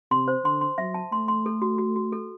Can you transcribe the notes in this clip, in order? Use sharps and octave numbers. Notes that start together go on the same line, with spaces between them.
C3 C6
C5
D3 C6
C6
F#3 E5
A5
A3 C6
C6
A4
F#4
F#4
F#4
A4